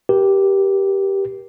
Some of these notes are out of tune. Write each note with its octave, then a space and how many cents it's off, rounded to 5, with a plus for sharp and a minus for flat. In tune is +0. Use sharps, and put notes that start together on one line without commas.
G4 -5 A#4 +35